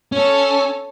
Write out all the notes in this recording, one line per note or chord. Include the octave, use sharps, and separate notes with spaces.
C#4 A4 C#5